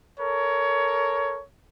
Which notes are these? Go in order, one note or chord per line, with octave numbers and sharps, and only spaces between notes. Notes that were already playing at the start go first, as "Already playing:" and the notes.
A4 A#4 C#5